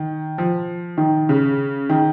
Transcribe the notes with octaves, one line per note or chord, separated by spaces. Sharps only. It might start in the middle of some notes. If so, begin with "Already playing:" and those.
Already playing: D#3
F3
D#3
C#3
D#3